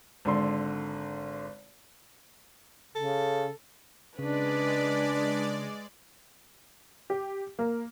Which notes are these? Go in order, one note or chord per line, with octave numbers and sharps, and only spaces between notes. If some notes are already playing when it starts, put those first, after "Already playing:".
G#1 D3 C6
C#3 A4
C#3 G#3 D4 B4 D5
G4
A#3